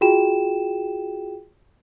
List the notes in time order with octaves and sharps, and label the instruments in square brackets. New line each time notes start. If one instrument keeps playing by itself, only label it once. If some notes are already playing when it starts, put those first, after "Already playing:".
[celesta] F4 F#4 G#4 G5 E7